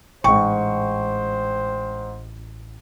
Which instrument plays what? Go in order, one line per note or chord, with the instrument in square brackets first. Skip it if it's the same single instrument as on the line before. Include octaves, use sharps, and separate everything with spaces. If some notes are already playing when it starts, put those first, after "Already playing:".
[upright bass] A1 [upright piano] G#2 G5 [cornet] C5 [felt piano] C#6